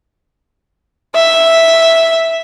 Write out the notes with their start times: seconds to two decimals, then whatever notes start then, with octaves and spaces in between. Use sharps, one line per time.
1.15 E5